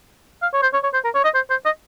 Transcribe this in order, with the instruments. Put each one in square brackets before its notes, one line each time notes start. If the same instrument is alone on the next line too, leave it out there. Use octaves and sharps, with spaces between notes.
[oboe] F5
C#5
C5
C#5
C#5
C5
A#4
C#5
D#5
C5
C5
D#5